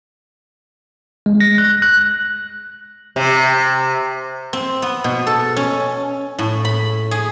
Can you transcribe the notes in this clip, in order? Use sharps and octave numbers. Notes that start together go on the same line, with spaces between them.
G#3
A#6
F#6
F#6
C3
C4
B3
B2
A4
C#4
A2
B5
G#4